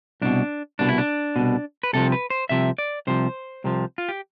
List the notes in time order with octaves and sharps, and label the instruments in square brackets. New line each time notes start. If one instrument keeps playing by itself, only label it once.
[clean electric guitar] C2 B2 D4
C2 B2 D4
E4
D4
C2 B2
B4
C2 C3 F3 A4
B4
C5
C2 C3 F3 E5
D5
C2 C3 F3 C5
C2 C3 F3
F4
G4